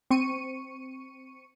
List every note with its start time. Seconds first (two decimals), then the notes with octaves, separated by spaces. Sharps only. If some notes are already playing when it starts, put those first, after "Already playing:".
0.11 C4 C#6 C#7 D#7